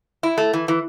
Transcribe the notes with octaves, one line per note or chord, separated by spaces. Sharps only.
E4
A3
E3
E3